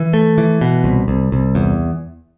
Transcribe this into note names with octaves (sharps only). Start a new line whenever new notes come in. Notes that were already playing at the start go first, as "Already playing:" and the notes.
Already playing: E3
A3
E3
B2
C2
C2
C2
E2